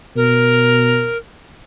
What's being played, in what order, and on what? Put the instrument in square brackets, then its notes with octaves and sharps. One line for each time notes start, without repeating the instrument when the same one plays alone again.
[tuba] B2 [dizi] A#4